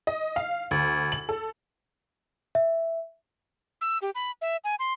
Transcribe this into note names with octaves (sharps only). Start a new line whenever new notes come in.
D#5
F5
D2
F#7
A4
E5
E6
G4
B5
E5
G#5
C6